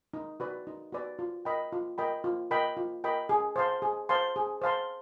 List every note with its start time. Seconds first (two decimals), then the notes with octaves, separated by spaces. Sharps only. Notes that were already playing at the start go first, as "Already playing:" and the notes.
0.14 D#4
0.40 F#4 B4 D5
0.67 D#4
0.92 F#4 B4 D5
1.19 F4
1.45 A#4 D#5 G5 B5
1.72 F4
1.98 A#4 D#5 G5 B5
2.24 F4
2.51 A#4 D#5 G5 B5
2.77 F4
3.04 A#4 D#5 G5 B5
3.29 G#4
3.56 C5 F5 A5 C6
3.82 G#4
4.09 C5 F5 A5 C6
4.36 G#4
4.62 C5 F5 A5 C6